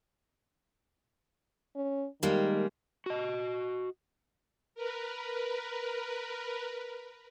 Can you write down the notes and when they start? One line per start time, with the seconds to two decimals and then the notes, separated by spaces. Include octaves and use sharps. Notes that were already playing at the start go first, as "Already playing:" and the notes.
1.76 C#4
2.23 D#3 G3 G#3 A#3
3.06 F#4 D#5
4.75 A#4 B4